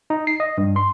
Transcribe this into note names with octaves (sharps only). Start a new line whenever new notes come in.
D#4
C7
D#5
G2
C6